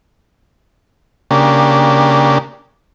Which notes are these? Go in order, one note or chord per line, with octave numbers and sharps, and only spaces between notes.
C#3 A#3 D4 G4